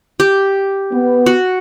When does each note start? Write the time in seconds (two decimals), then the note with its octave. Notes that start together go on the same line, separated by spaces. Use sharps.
0.20 G4
0.92 B3
1.26 F#4